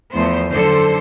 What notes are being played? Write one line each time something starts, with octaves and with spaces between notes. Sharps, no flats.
E2 F3 A3 B3 C5
F#2 D3 A4 C5